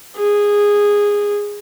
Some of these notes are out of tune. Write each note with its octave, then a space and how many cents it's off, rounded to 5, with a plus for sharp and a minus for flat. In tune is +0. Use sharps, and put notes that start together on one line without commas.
G#4 -15